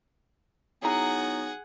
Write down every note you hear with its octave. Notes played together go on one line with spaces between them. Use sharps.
F#3 B3 D#4 E4 G#4 F#5 A#5